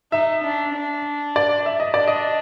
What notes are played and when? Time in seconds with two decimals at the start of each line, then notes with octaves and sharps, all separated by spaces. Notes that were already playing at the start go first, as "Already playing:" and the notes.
0.12 D#4 E5
0.43 D4
0.75 D4
1.36 D5
1.66 E5
1.80 D#5
1.94 D4 D5
2.08 D#5